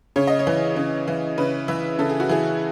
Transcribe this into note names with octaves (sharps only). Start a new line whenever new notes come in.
C#3 C#5
D#5
C#5
E3
C#3
E3
C#3 B4
E3 E5
C#3 A4
G#4
F#4
E3 G#4